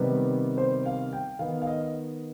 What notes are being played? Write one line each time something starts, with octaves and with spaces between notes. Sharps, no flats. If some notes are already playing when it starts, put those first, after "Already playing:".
Already playing: C3 D#3 G3 B3 B4
C5
F5
G5
D#3 B3 F5
F5
D#5